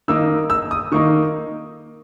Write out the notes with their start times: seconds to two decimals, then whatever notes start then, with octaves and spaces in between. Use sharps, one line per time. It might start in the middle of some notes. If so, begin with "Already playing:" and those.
0.08 D#3 A#3 D#4 E6
0.50 E6
0.71 D#6
0.92 D#3 A#3 D#4 C#6